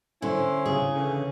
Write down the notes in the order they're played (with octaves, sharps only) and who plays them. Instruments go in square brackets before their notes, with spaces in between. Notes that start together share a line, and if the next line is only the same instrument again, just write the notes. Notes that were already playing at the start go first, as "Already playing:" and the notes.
[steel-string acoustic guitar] D3 C5 [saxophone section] C#4 E4
[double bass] C#3 [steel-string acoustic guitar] G#4
[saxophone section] D3 E3 C#4